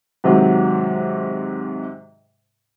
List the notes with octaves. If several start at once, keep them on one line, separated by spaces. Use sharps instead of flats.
G#2 C3 D#3 F#3